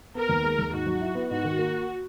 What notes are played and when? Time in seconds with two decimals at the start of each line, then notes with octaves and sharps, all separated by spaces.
0.15 B3 A#4
0.29 D#2
0.43 G#3
0.59 D#2
0.73 G#2 F#4
0.86 F#3
1.01 E4
1.15 B3
1.30 G#2 F#4
1.44 D#3
1.58 A#3